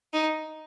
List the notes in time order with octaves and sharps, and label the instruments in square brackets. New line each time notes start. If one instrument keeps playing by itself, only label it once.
[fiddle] D#4